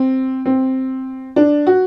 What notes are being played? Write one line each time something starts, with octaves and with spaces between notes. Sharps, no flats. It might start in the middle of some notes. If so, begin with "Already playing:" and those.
Already playing: C4
C4
D4
F#4